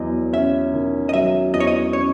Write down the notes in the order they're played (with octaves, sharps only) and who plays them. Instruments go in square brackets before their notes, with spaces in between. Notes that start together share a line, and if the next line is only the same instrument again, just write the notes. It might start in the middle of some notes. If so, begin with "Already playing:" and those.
Already playing: [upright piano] E2 F#3 [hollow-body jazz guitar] D#5
[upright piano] C#4 [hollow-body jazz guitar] E5
[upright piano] D#3
[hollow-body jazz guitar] D#5
[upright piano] F#3 [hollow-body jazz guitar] E5
[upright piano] E2 [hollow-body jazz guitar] D#5
[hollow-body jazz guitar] C#5
D#5
[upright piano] C#4 [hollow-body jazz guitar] C#5